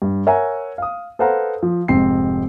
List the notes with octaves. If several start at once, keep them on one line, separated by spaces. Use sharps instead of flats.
G2
A#4 C#5 E5 F#5 G#5 A#5
F5 D#6
A4 B4 C5 F5 F#5 A#5
F3
F1 G#2 C4 C7